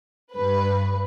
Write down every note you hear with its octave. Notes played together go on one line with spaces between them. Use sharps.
G2 B4